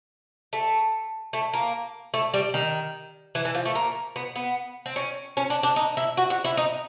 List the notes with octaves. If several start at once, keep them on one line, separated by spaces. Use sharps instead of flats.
A3
A3
A#3
A3
G3
D#3
E3
E3
F3
A3
A#3
B3
B3
C4
C#4
C#4
D4
D4
D#4
E4
F#4
F#4
E4
D#4